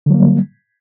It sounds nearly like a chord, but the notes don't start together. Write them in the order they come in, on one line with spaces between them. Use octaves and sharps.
D3 F#3 A#3 G3